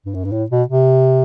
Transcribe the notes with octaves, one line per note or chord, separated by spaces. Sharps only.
G2
F#2
G2
A2
B2
C3